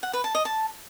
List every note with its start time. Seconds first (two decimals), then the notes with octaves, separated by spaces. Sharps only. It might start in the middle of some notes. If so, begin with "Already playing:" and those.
0.03 F#5
0.13 B4
0.24 A5
0.35 D#5
0.45 A5